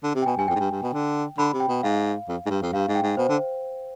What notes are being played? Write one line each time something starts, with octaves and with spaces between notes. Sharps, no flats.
D3
C3
G5
B2 G#5
G2 G#5
F2 G5
G#2
G2
G2
B2
D3
D3 B5
C3
G5
B2
G#2 F5
F2
G#2
G2
F2
G2 F5
G#2
G5
G#2
B2 C5
D3